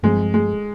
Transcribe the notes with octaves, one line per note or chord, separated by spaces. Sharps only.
G2 F3 G#3 C4
G#3